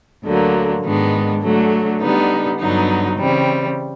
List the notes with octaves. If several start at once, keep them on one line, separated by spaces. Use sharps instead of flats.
D2 D3 F#3 A#3
G#2 D#3 G#3 B3 D4
D3 F#3 A3
D3 G3 B3 D#4
G2 D3 F#3 B3 D#4
C#3 E3 G3 C4